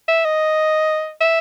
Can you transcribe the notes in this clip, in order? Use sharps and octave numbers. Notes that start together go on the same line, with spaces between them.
E5
D#5
E5